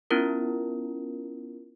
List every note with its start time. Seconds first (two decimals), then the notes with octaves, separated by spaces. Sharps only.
0.11 B3 C#4 E4 F4 A#4